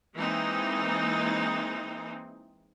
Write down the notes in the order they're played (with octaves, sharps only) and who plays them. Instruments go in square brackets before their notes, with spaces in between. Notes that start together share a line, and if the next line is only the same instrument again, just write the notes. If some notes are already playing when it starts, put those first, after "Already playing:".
[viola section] E3 G#3 A#3 C4 D#4